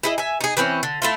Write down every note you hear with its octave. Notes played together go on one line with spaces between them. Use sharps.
E4 G#4 D#5
E5 G#5
D#4 G#4
E3 A3 C4 C#4
D3
A3 E4 F4